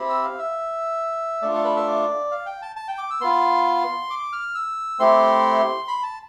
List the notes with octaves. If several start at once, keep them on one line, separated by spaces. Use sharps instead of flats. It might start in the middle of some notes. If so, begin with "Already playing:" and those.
Already playing: C4 E4 G4
E6
F5
E5
A3 D4 F4 D5
A4
B4
E5
D5
F5
G5
A5
A5
G5
D6
E6
B3 F4 C6
D6
F6
E6
A3 C4 E4 G4 C6
B5
A5